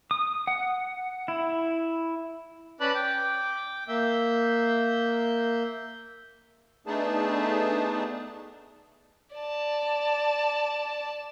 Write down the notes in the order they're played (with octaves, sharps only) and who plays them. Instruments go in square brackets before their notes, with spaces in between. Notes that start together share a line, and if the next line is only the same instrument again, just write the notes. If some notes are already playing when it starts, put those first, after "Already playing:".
[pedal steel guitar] D#6
F#5
E4
[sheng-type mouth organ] C#4 B4 D5 A5 B5 F#6
G5 D6
A#3 E5 G6
[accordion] A3 B3 D4 D#4 G#4 A5
[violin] D5 A5